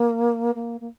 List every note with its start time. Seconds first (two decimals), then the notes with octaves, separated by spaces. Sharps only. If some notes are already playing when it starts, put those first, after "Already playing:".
Already playing: A#3
0.55 A#3
0.81 A#3